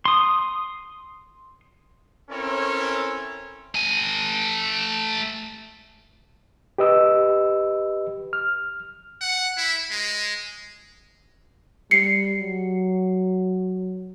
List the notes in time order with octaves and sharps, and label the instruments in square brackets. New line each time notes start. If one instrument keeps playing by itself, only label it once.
[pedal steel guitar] C6 D#6
[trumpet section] C4 C#4 E4 A4 A#4 C#5
[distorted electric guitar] A3 G#5
[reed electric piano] G4 B4 D#5 E6
F6
[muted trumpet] F#5
E4
G#3
[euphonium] G3 [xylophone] C7 C#7
[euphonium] F#3